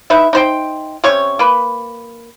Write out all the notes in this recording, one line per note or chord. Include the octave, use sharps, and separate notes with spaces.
D#4 B4 E5
D#4 C5 G5
C3 C#4 C#5 C#6
A#3 B4